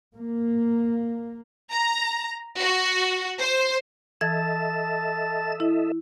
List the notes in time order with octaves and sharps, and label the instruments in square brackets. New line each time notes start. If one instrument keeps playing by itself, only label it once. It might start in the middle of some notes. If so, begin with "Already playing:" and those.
[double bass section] A#3
[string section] A#5
F#4
C5
[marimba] E3 G#6 [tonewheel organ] A4 D#5 E5 [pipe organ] A5 A6
[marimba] E4